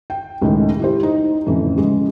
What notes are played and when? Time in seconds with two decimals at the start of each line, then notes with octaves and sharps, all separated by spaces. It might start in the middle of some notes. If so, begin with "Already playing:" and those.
0.10 G5
0.42 C#2 A2 D#3 G#3
0.79 E4 G4 C5
1.03 D#4
1.46 F2 A2 C#3 E3
1.77 C#3 G#3